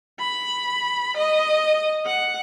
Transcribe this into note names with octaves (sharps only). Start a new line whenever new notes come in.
B5
D#5
F#5